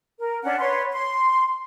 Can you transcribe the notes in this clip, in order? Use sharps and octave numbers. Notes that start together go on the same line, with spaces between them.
A#4
C#4 D4 F#5
B4 C#5 C6
C6